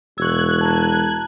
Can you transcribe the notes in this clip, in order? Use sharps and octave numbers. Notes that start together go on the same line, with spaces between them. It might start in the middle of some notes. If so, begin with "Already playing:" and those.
E1 C#6 E6 F#6 G#6
A5 A#5